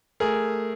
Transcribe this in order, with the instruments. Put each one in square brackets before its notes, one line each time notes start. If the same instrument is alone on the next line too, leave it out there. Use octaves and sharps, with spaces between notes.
[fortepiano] A3 G#4 A#4